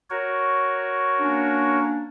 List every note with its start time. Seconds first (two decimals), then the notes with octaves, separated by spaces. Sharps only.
0.10 F#4 A#4 C#5
1.19 A#3 C#4 D4